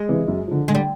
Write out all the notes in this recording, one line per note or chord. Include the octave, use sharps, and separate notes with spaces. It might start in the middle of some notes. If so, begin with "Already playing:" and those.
Already playing: G#3
C3 E3
F#2
D3 F3
D3 G#3
G3